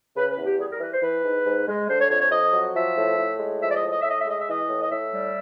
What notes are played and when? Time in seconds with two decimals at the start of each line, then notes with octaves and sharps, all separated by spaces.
0.16 C#3 B4
0.30 B4
0.37 E2
0.45 G4
0.59 G3 G#4
0.71 A#4
0.80 E3 B4
0.92 C5
1.02 E3 B4
1.25 G#2
1.46 G#2
1.68 G#3
1.88 D3 C5
1.99 C#5
2.10 F2 C#5
2.21 C#5
2.31 F2 D#5
2.53 F#3
2.75 F3 E5
2.97 A2
3.19 A2
3.40 G#3
3.61 F3 E5
3.71 D5
3.76 D#5
3.83 A2
3.90 D#5
4.01 A2 E5
4.09 D#5
4.19 E5
4.26 G#3 D#5
4.40 E5
4.48 E3 D#5
4.69 A2
4.81 D#5
4.90 A2 E5
5.13 G3